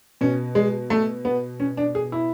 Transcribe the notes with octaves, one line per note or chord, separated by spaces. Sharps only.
B2 C#4
G#3
A3
B3
C#4
D4
G#4
E4